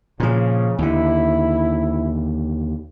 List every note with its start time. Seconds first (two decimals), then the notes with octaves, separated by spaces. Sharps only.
0.20 A#2 C#3 F3
0.78 D#2 D3 E4